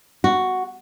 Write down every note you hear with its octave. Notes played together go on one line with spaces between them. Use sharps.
F#4